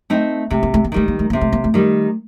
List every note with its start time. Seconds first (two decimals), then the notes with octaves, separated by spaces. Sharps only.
0.10 A3 C4 D#4
0.50 C3 A3
0.63 A#3
0.74 A3
0.84 A#3
0.92 D#3 G3 A3
1.08 A#3
1.19 A3
1.30 C3 A#3
1.41 A3
1.53 A#3
1.64 A3
1.74 D#3 G3